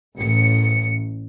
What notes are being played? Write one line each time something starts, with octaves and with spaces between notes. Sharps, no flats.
A1 C#7